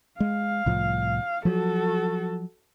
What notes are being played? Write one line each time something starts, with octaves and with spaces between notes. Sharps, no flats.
G#3 F5
C2 A2 F3
F3 F#3 F#4 A4